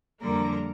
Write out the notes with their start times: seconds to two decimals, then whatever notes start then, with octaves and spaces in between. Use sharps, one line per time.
0.21 F2 D3 G3 A#3 A#4 A#5